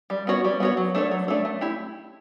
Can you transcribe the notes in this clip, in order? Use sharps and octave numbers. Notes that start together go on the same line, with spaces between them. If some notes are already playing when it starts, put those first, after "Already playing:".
G3
B3 F#4 C#5
G3
B3 F#4 C#5
F#3
A3 D4 A4 C#5
F#3
A3 D4 A4 C#5
A3
E4 G4